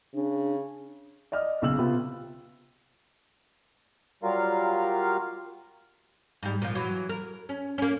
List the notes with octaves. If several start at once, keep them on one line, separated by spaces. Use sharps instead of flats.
C#3 D4
D5 D#5 F6
B1 C#3 E6 F#7
C3 B3 F4
F#3 G3 F4 A#4 F5
G#2 G3
A#2 F3
E3 F#3
A#4
C#4
A#3 C#4